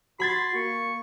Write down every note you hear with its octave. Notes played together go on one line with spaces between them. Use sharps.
F#4 B5 C6 G#6 A6
A#3 C#6